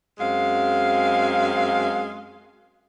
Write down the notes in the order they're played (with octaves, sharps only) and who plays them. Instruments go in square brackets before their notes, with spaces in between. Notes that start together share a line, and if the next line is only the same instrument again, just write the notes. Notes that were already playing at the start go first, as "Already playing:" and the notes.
[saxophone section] F#2 G#3 C4 F5